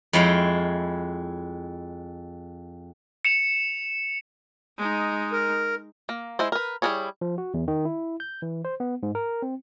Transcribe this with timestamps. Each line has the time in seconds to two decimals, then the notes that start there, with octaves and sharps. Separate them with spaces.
0.13 F2 G#3 E4 C#5 F5 G5
3.25 C#7 E7 F7
4.78 G#3 D#4
5.32 A#4
6.09 A#3
6.39 G#3 E4 C5
6.52 A#4 B4
6.82 G3 E4 F4 G#4 C#5
7.21 F3
7.38 F#4
7.54 E2
7.68 D#3
7.85 E4
8.20 G6
8.42 E3
8.65 C5
8.80 B3
9.03 G#2
9.15 A#4
9.42 C4